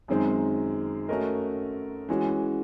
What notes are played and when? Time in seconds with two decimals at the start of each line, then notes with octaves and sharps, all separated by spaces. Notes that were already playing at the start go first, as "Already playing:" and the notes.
0.08 F#2 D#3 G#3 C4
1.08 A3 C#4 F#4 A#4 D#5
2.09 E3 G#3 C#4 F#4